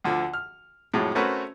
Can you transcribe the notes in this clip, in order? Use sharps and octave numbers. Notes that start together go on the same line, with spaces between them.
D2 D3 F3
F6
F2 A2 F#3 G#3 E4
A3 C4 C#4 F#4 A#4 B4